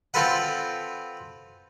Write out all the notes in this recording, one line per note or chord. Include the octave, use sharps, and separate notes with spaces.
C4 F4 A4 B4 F#5